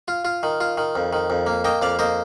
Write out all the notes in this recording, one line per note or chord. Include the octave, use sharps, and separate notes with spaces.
F4
F4
D#3
F4
D#3
F2
D#3
F2
A#3
A#3 D#5 G5
F2 D5 F5
A#3 C5 D#5